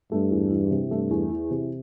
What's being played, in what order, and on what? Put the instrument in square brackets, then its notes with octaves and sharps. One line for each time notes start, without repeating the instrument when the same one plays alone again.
[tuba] G2 [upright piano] A3
[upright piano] E2
E3
C3
[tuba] G2 [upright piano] A3
[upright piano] E2
E3
C3